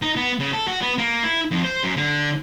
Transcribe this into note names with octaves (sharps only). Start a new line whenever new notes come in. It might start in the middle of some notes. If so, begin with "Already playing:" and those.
D#4
B3
C#3
A4
F#4
B3
A#3
E4
F2
C5
F#2
D3